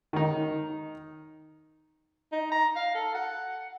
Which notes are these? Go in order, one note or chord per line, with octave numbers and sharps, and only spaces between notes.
D#3 D#4
D#4
A#5
F5
A4
F#5